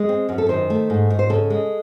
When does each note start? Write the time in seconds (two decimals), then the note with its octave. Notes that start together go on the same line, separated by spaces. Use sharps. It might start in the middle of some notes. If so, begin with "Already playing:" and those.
Already playing: G#3
0.09 C4
0.29 F#2
0.38 A4
0.49 D#3 C5
0.70 A3
0.90 G#2
1.10 G#2
1.19 C5
1.30 C#3 A4
1.50 G#3